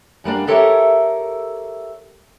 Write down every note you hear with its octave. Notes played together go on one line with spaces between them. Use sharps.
F#2 G3 A#3 D4
G4 A4 A#4 C#5 E5